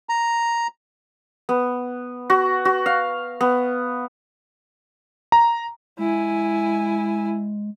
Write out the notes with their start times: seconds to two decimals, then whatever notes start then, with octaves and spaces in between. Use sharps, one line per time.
0.09 A#5
1.49 B3
2.30 F#4
2.65 F#4
2.86 F5
3.41 B3
5.32 A#5
5.99 G#3 E4 G#5